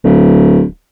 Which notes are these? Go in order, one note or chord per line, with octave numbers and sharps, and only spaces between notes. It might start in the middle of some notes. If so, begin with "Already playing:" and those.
D1